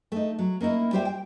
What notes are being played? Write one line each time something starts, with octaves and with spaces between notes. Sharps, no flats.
A3 D#4
F#3
A#3 C#4 D#4 E4
G3 F4 G4 C5 E5 G5
G5